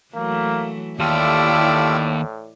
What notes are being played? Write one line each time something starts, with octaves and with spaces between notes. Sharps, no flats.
E3 F#3 A3 A#3
D#2 A2 E4 F4 G4 A4 D5